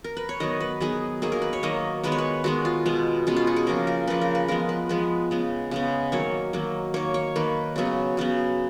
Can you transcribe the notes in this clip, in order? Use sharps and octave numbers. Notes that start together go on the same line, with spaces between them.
A#4
B4
C#5
D#3 F#3 B3 D#5
B4
D#3 F#3 B3 G#4
D#3 F#3 A#3 G#4
A#4
B4
C#5
D#3 F#3 A#3 D#5
D#3 G#3 B3 B4
C#5
B4
D#3 G#3 B3 F#4
F4
B2 G#3 B3
B2 G#3 B3 C#4
F4
F#4
G#4
C#3 F3 A#3 A#4
A#4
C#3 F3 A#3 B4
A#4
B4
F3 G#3 B3 A#4
B4
F3 G#3 B3 B4
C#3 G#3 B3
C#3 G#3 B3
D#3 F#3 A#3 C#5
D#3 F#3 A#3
D#3 A#3 C#5
C#5
D#3 A#3 B4
C#3 F#3 B3
C#3 F#3 B3